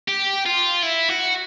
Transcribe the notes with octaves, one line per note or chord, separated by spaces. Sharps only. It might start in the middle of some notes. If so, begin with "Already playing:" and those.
G4
F4
E4
F#4